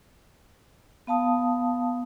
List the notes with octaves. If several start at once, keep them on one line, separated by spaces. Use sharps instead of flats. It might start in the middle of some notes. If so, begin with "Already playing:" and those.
B3 F5 A5 D#6